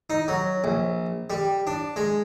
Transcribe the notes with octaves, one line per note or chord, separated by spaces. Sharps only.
D#4
F#3
A#1
G3
D4
G#3